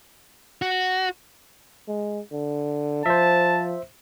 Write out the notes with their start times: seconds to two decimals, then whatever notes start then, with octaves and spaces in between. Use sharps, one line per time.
0.62 F#4
1.88 G#3
2.32 D3
3.06 F3 C5 E5 A5